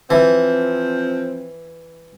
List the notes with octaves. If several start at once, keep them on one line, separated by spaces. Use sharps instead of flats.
E3 F3 C4